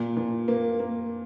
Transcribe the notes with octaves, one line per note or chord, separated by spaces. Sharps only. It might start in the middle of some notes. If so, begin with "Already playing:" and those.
Already playing: A#2
A#2
A#3
A#3